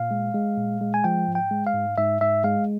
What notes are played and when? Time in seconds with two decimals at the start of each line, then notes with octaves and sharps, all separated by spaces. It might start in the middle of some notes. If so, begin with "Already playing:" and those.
Already playing: A#2 F5
0.11 G#3
0.34 G#3
0.57 A#2
0.81 G#3
0.94 G#5
1.04 F3 G5
1.28 G#2
1.35 G5
1.51 G#3
1.67 F5
1.74 G#2
1.97 G#2 E5
2.21 G#2 E5
2.44 G#3 F5